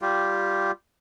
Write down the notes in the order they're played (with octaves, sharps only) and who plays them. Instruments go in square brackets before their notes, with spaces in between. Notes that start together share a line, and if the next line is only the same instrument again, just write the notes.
[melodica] G3 F4 G4